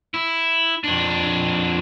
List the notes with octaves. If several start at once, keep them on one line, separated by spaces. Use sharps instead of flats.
E4
F2 D4